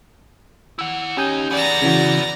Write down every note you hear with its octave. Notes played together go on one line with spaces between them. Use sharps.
E4 F#5
D#2 C#4 D#4 G4 G#5
B3 G#4 D5 A#5
C#3 E3 F#4